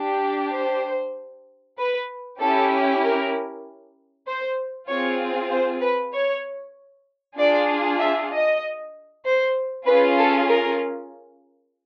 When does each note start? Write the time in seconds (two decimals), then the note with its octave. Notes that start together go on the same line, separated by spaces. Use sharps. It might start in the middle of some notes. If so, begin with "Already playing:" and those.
Already playing: D4 G4
0.54 C5
1.78 B4
2.40 C#4 E4 G4 A4
3.03 A#4
4.27 C5
4.89 C4 F4 G#4 C#5
5.51 C5
5.82 B4
6.13 C#5
7.38 D4 F4 G#4 D5
7.99 E5
8.32 D#5
9.25 C5
9.86 C#4 F4 G#4 B4
10.18 A4
10.49 A#4